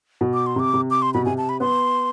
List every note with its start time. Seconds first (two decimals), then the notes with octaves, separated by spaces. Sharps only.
0.21 B2
0.34 D6
0.46 C6
0.56 C3 D6
0.74 C3
0.91 D6
1.02 C6
1.14 B2 B5
1.25 C3 G#5
1.38 A5
1.49 B5
1.60 B3 C6